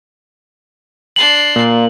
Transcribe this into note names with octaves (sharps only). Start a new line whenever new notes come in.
D4 C6 F#7
A#2